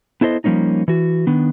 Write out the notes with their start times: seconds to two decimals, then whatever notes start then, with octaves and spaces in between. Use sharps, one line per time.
0.21 B3 E4 A4 C5 D#5
0.44 F3 G3 A#3 C#4 D#4
0.88 E3 F#4
1.27 D#3 B3 D4